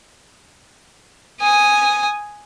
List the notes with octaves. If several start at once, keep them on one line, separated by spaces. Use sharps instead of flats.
G#5 D#6